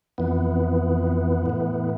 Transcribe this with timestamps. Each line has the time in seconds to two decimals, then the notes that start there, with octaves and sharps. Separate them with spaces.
0.18 F2 E3 B3
1.46 A2 E3